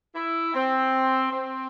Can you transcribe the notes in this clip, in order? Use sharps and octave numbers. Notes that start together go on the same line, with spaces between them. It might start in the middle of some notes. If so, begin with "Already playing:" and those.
E4
C4
C4